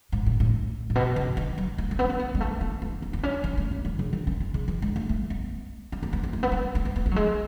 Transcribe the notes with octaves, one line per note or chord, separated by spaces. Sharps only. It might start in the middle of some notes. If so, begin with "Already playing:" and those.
G#2
A2
A2
A2
B2
C#3
D#3
F#3
A3
A3
B3
C#4
B3
G#3
A3
B3
B3
B3
B3
C#4
D#3
A3
C#4
D#3
C#3
D#3
C#4
B3
C#3
E3
G#3
A3
A3
B3
C#4
B3
B3
B3
A3
B3
A3
A3
A3
B3
A3
F#3
G#3